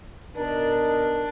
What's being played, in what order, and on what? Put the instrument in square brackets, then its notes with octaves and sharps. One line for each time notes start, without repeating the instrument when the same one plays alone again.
[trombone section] B2 D#4 A#4 [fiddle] D4